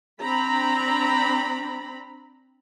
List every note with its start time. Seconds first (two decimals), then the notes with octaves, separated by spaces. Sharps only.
0.21 C4 D4 A#5 B5